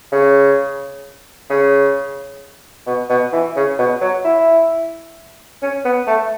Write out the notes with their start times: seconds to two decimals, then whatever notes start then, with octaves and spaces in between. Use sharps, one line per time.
0.12 C#3
1.50 C#3
2.87 B2
3.10 B2
3.33 E3
3.56 C#3
3.79 B2
4.01 F#3
4.24 E4
5.62 C#4
5.85 B3
6.07 A3